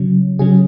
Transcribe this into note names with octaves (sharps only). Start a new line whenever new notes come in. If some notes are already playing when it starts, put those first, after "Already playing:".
Already playing: C#3 F#3 C#4
C#3 F#3 C#4 G#4